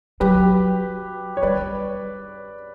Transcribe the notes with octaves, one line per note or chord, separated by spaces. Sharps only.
F#3 G4 B4
C#5
G3 B4 D5